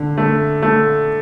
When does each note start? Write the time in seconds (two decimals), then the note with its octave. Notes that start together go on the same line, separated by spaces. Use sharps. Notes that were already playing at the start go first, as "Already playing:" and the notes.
Already playing: D3
0.18 A3
0.62 A3